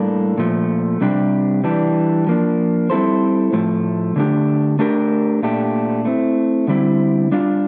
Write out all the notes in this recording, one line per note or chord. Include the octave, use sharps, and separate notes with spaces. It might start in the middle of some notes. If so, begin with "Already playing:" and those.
Already playing: A2 G3 A#3 D4 A4
A#2 F3 A3
C3 G3 D4 G4
E3 G3 D4
F3 A#3 D4
G3 C4 E4 A4 C5
A2 F3 A3
D3 A3 D4 G4
A3 D4 G4 A#4
A#2 A3 D4 G4
A3 C4 E4
D3 G3 C4 E4
G3 D4 F4